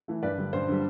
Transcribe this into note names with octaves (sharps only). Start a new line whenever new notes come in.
E3 A3
G2 B4 D5
D3 G3
G2 C5
D3 G3